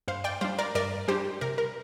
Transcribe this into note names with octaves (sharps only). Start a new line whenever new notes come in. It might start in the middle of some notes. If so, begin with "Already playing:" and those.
G2 C5 F5
D5 G5
G3 D4 C5 F5
A#4 D5
G2 A#4 D5
G3 D4 G4 C5
C3 A#4
A#4